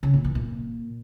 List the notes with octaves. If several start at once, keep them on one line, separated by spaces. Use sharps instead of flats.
C#3
A#2
E3
A#2